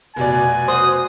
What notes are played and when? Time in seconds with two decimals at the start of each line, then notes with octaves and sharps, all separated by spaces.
0.16 F1 B2 D5 G#5
0.68 F#4 C5 D#6